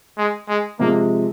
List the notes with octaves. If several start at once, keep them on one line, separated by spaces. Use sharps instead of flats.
G#3
G#3
C3 F3 G#3 A#3